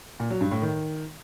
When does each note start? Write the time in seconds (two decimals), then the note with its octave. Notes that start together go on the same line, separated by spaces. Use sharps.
0.20 A#2
0.30 F#3
0.41 G2
0.51 A2
0.62 D#3